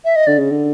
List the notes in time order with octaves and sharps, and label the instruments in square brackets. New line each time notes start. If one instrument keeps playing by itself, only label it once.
[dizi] E5
D#5
[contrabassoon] D3 [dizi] D5
[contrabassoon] C#3
D3